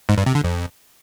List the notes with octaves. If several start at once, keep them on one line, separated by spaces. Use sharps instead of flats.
G#2
G2
C3
D3
F2